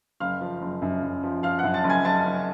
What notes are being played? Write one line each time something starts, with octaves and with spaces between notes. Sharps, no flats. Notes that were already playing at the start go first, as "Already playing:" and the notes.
F#1 F5 F6
F3
F#1
F#2
F#2
F3
F3 F5 F6
F#2 F#5 F#6
A5 A6
F#1
G#5 G#6
F#1 A5 A6
F#1